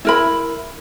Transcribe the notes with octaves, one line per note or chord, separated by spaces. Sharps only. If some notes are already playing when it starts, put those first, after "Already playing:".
E4 A#4 B5